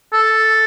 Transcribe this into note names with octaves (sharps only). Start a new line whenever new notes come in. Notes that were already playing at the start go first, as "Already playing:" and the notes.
A4